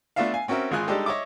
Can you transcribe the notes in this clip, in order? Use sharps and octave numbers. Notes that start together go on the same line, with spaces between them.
A3 B3 D4 F4 E5 F5
F5 G#5
C4 C#4 F#4 A#4 E5
G#1 G#3 F4 G#4 G#5 F#6
G3 G#3 D4 D#4 G4 A4
C#5 D#5 E5 D6